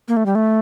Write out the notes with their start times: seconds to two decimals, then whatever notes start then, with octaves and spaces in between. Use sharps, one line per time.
0.08 A#3
0.17 A3
0.26 G3
0.35 A3